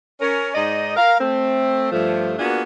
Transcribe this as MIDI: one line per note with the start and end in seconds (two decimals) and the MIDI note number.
0.21 0.51 61
0.21 0.51 70
0.54 0.93 44
0.54 0.93 63
0.54 0.93 74
0.54 0.93 75
0.96 1.16 70
0.96 1.16 77
1.21 1.88 57
1.21 1.88 60
1.92 2.34 43
1.92 2.34 53
1.92 2.34 57
2.39 2.62 58
2.39 2.62 59
2.39 2.62 62
2.39 2.62 65
2.39 2.62 66
2.39 2.62 68